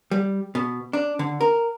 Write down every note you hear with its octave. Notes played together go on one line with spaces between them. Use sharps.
G3
B2
D4
D3
A#4